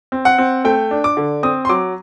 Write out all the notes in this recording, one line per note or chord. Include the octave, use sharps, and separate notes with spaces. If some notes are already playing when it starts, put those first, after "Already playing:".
C4
F#5
C4
A3 G5
D4
D6
D3
C4 D#6
C6
F#3 D6